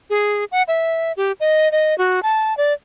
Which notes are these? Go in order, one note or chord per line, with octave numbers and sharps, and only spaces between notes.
G#4
F#5
E5
G4
D#5
D#5
F#4
A5
D5